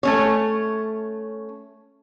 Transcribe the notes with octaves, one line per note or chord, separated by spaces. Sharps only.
A3 C#4 C#5